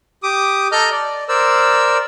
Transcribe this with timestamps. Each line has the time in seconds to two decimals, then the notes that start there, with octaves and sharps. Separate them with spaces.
0.23 G4 D6 D#6
0.72 A4 D#5 A#5 F6 G6
0.91 D5
1.29 A#4 C5 D5 E6